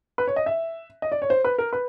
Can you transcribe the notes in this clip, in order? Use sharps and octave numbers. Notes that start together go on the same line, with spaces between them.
B4
C#5
D#5
E5
D#5
D5
C#5
C5
B4
A#4
B4